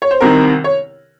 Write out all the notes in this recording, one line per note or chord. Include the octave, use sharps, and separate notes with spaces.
C#5
C5
C2 C3 D#3 A#4
C#5